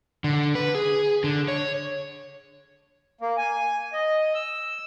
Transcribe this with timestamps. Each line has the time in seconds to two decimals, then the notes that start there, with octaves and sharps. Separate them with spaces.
0.24 D3
0.55 B4
0.75 G#4
1.24 D3
1.48 C#5
3.21 A#3
3.38 G#5
3.93 D#5
4.35 E6